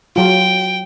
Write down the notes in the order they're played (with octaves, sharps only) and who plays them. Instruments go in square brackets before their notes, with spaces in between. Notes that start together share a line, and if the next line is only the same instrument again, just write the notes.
[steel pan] F#3 F4 [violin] G5